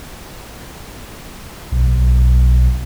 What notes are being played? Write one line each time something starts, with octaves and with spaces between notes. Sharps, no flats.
B1